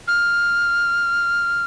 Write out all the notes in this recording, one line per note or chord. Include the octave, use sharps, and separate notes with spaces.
F6